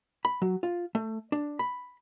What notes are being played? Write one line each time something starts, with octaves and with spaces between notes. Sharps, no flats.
B5
F#3
F4
A3
D4
B5